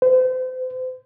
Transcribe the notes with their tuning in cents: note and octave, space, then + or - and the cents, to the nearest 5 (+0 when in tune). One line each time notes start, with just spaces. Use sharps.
C5 -35